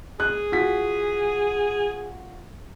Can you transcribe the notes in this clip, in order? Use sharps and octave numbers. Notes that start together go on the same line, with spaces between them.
G#4 F#6
F4 F#4 B6